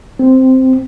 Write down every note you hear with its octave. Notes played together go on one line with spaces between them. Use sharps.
C4